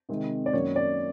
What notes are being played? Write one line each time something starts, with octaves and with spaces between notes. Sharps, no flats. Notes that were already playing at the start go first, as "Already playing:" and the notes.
C3 D#3 G#3 C4
D5
F#2 D#3 F#3 A#3 C#4 C#5
D5